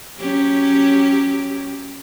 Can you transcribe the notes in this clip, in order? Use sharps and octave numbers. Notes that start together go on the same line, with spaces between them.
F#3 C#4 G4